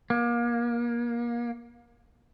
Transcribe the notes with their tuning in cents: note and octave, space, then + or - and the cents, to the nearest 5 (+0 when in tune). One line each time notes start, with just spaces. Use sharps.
A#3 +30